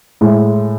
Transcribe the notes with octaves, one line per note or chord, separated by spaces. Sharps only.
A2 G#3